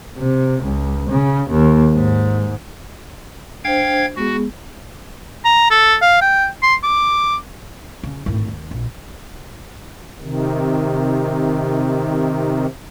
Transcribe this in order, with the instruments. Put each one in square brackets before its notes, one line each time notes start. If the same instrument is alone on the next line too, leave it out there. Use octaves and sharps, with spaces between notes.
[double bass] C3
C#2
C#3
D#2
G#2
[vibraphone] D4 C5 [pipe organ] F5 G5 G#6
[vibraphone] G#3 B3 G#4 [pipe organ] F#4
[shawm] A#5
A4
F5
G5
C6
D6
[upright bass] C#3
G#1 A2
D#2
A#1
[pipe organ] C3 D#3